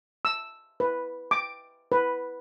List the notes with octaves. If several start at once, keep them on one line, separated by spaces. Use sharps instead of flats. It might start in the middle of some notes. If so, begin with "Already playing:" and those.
E6
B4
D6
B4